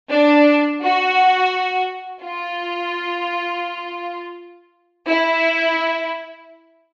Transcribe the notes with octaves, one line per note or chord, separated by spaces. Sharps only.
D4
F#4
F4
E4